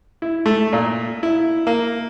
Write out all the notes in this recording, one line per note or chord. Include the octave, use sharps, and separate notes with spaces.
E4
A3
A#2
E4
A#3